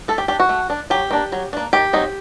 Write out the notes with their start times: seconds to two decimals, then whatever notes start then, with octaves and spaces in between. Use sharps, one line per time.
0.08 A3 A4
0.18 G4
0.28 D4 G4
0.40 F#4
0.49 A3
0.70 D4
0.90 F#3 G4
1.11 A#3 D4
1.32 F#3
1.53 A#3 D4
1.73 D#3 G4
1.93 F#3 C4 D#4